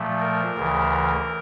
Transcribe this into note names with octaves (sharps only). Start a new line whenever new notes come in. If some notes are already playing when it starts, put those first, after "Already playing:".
Already playing: A#2 F3 A3
A#4
D2 C#3 E3